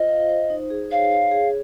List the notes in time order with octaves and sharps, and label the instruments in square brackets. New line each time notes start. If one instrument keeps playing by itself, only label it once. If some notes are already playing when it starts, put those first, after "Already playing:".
Already playing: [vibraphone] F4 C5 [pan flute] D#5
[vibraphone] F5
C5
D#4
G#4
[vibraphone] C#5 [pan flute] F5
[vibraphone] C#5
G#4